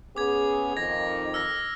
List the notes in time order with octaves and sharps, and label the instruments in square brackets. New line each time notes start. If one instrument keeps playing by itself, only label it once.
[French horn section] B3 C#4 G#4 [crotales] D6 G#6
[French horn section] F2 D#3 [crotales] G#6 A#6
[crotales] E6 F6 A#6